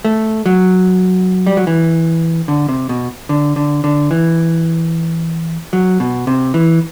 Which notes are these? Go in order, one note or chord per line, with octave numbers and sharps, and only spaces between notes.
A3
F#3
G3
F#3
E3
D3
C3
B2
D3
D3
D3
E3
F#3
B2
C3
E3